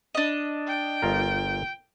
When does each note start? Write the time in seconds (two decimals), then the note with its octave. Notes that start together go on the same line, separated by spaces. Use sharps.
0.15 D4 D#5
0.67 G5
1.02 G1 F4 A#4